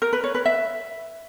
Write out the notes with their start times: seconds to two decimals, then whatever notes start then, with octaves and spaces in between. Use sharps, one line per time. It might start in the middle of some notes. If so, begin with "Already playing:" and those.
0.02 A#4
0.13 B4
0.24 C#5
0.35 B4
0.46 E5